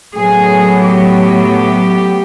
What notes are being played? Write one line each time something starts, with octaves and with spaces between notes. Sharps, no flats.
A2 F#3 B3 G#4
G4